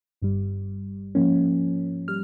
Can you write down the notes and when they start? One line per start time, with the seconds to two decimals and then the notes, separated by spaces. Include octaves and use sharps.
0.22 G1 G2 G3
1.15 G#2 F3 A#3 C#4
2.08 G3 F6